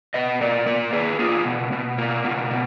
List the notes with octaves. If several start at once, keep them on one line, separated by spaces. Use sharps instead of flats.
B2 B4 D#5
A#3 A#4 D5
A#3 A#4 D5
A#3 G#4 B4
A#3 F4 G#4
B2
B2
A#3
B2
B2